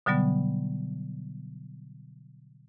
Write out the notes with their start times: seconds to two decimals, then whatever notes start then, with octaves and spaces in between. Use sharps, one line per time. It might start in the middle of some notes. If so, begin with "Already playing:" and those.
0.06 B2 D3 F#3 G3 B3